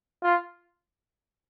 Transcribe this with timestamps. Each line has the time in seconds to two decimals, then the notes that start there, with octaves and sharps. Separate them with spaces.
0.23 F4